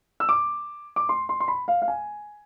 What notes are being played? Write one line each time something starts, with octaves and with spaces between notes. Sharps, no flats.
E6
D6
D6
C6
C6
C6
B5
F5
F5
G#5